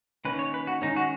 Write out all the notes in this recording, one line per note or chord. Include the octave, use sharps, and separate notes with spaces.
D#3 A#3 C#4 B4
C#5
B4
F#4
D#3 G#3 C#4 D#4
F#4